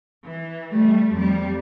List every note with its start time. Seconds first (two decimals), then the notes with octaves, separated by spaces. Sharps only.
0.24 E3
0.73 G3 A3
1.14 F2 G3